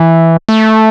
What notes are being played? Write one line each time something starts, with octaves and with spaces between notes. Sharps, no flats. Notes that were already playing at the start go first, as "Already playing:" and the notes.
Already playing: E3
A3